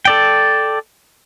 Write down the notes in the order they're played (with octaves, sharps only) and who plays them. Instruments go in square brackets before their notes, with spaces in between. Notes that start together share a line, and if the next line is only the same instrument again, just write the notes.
[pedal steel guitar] A4 D5 G5